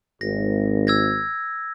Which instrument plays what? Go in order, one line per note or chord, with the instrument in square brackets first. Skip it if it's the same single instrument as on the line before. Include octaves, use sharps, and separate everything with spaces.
[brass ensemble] G#1 [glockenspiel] A#6
[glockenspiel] E6 G#6 A#6